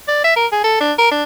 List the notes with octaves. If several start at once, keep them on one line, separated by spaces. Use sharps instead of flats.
D5
E5
A#4
G#4
A4
D4
A#4
D4